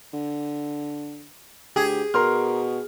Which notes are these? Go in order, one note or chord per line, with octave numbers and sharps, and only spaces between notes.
D3
D2 G4 G#4
B2 A#4 C6 F6